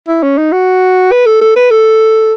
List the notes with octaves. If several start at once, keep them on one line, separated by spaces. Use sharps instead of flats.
E4
C#4
D#4
F#4
B4
A4
A4
B4
A4